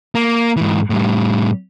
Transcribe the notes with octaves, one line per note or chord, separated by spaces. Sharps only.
A#3
G#2 E3
A2 G3